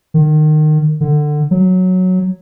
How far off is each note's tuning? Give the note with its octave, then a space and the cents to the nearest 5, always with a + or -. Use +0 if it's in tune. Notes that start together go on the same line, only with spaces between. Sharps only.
D#3 -25
D3 +20
F#3 -5